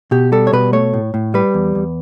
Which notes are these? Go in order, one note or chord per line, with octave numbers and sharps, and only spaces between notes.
B2 G4
G3 A4
C#5
B2 B4
A3 C#5
A2
A2
G3 B4
E2
E2